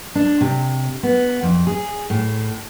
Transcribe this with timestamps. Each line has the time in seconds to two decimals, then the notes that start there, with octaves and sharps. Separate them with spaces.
0.15 D4
0.41 C3
1.03 B3
1.43 F2
1.67 G#4
2.10 A2